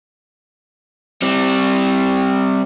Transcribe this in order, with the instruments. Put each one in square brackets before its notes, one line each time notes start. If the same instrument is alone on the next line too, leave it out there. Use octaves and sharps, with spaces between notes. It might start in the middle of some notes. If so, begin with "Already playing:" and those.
[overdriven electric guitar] G3 C4